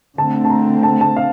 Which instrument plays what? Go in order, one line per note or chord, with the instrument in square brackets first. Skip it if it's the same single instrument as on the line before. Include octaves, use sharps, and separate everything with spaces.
[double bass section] D3 A3 C4 [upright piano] A5
[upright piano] A5
A#5
A5
A5
F5